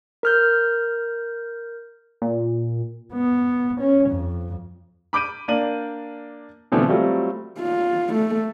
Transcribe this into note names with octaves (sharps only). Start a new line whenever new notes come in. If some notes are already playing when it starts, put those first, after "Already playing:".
A#4 F6 G6
A#2
B3
C#4
F2
B5 D6 G6 D7 D#7
A#3 D4 D5 D#7 F#7
B2 D3 E3 F3 A3 C4
F#3 G3 A3 C4 F4
F4
A3